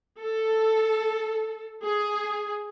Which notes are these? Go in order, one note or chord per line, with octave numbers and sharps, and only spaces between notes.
A4
G#4